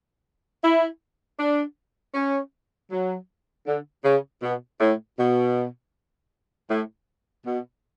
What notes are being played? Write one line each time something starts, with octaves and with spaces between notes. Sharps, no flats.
E4
D4
C#4
F#3
D3
C#3
B2
A2
B2
A2
B2